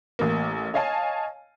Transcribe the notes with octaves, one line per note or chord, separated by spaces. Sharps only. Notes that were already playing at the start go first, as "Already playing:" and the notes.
A1 A#3
C#5 D#5 F5 G#5 A5